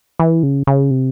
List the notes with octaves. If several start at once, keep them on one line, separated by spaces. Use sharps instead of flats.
E3
C#3
C#3
C3